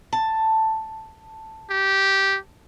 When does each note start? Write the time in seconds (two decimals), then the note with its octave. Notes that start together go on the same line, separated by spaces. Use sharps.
0.13 A5
1.70 G4